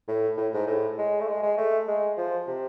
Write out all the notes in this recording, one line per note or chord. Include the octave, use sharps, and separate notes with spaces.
A2
A2
G#2
A2
G#3
A3
G#3
G#3
A3
G#3
F3
C3